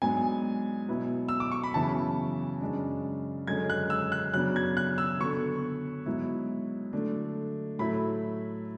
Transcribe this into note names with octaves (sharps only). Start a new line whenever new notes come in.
G#2 F#3 B3 D4 G#5
B2 F#3 B3 E4
E6
D6
C#6
B5
F#2 C#3 E3 B3 E4 A5
F#2 C#3 G#3 D4
F#2 D3 G#3 C#4 G#6
F#6
E6
F#6
F#2 C#3 F#3 B3 D4 F#6
G#6
F#6
E6
D3 F#3 B3 C#6
G#2 F#3 B3 E4
D3 F#3 A3 D4
A2 F#3 A3 E4 B5